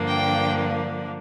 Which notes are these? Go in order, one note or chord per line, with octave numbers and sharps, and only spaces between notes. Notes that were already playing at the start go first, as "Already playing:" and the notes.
Already playing: G2 D3 F3 A#3 D4
G5